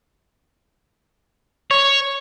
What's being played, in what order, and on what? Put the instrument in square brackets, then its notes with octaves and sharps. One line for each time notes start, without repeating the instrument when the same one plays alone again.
[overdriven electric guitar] C#5